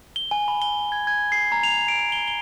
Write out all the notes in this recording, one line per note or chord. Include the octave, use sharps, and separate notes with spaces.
G7
G#5
B5
G7
G#6
G#6
C7
A#5
F7
D7
G7
G7